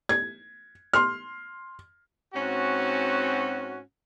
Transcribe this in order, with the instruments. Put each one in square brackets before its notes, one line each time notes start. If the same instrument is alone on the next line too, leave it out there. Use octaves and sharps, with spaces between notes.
[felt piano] G#6
C6 F6
[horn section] G#2 C4 C#4 F#4